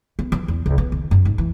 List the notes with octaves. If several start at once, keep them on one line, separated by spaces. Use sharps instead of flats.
B3
E3
E2
C#2
B3
D#3
F#2
G#2
E3